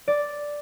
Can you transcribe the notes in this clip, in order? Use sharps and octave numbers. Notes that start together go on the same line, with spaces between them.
D5